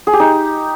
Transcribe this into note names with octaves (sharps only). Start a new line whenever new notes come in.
G#4
G4
D#4